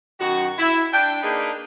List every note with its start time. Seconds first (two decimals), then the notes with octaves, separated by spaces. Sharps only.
0.19 F#2 D#3 F#4
0.57 E4
0.93 D4 G5
1.22 A#3 D4 D#4 G#4 B4